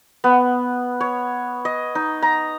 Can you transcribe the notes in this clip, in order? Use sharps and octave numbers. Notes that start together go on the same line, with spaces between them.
B3
C#5
D#5
D#4
A#5